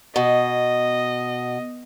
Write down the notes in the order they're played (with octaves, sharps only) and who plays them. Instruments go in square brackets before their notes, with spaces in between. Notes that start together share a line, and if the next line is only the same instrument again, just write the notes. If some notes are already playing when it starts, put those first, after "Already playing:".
[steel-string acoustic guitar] B2 [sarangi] D#5